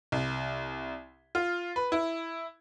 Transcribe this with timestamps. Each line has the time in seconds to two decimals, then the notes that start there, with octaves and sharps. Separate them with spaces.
0.12 C2
1.35 F4
1.76 B4
1.92 E4